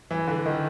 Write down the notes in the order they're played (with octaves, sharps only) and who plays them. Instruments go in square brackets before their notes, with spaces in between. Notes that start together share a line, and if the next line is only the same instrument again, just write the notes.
[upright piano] E3
D3
D#3